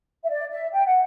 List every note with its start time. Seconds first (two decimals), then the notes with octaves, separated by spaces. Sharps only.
0.24 E5
0.30 D5
0.52 E5
0.73 G5
0.85 F#5